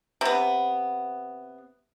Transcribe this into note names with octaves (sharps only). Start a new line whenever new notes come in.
C3 B3